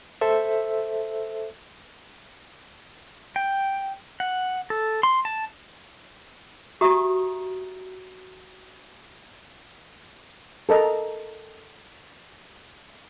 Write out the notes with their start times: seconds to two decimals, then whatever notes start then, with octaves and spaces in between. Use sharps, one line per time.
0.21 A4 C5 E5
3.36 G5
4.20 F#5
4.70 A4
5.03 C6
5.25 A5
6.81 F#4 G4 E5 A#5 D#6
10.69 A4 A#4 D#5 A#5